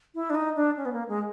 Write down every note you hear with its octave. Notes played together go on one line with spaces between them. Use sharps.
E4
D4
D#4
D4
C#4
B3
A#3
G#3